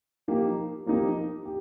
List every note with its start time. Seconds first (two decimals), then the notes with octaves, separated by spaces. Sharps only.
0.28 F3 A#3 D#4 G4
0.86 F3 A#3 D#4 G4
1.45 G4